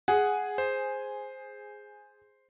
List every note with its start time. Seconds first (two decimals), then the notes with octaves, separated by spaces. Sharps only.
0.08 G#4 F#5
0.58 C5